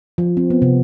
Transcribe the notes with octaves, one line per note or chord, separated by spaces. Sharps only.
F3
C4
B3
C3